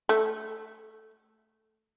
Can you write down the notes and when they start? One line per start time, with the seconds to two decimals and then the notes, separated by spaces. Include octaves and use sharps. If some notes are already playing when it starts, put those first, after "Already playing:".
0.09 A3